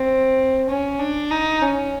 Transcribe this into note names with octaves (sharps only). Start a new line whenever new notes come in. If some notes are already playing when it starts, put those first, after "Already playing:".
Already playing: C4
C#4
D4
D#4
C#4